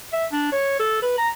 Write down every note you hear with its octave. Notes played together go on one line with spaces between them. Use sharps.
E5
D4
C#5
A4
B4
A#5